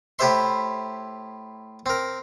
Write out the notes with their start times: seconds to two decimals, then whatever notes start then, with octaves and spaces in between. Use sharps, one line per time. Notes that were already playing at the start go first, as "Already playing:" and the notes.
0.19 A2 E4 G4 C5 E5 C6
1.86 C4 A#4